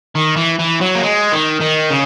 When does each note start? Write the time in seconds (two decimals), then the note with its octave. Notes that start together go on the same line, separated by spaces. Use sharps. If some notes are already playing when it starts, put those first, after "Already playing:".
0.15 D#3
0.37 E3
0.59 E3
0.81 F#3
0.95 A#3
1.03 G#3
1.32 D#3
1.61 D#3
1.90 C#3